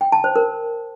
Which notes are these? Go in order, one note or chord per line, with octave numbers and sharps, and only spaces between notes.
G5
A5
C5
A#4